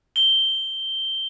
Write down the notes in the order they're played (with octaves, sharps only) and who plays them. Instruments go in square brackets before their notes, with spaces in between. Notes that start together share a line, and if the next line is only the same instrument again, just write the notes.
[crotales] G7